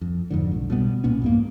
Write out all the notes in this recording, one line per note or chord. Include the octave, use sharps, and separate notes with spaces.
F2
F2 G#2 D3
B1
B2 G3 B3
C2 A#2 B3 C#4
F2 G#2 A#3